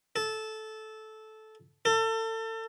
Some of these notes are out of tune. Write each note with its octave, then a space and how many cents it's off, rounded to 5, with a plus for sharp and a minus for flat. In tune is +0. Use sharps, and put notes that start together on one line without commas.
A4 -15
A4 +30